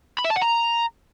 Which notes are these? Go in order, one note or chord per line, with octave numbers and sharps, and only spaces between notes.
B5
E5
A5
F#5
A#5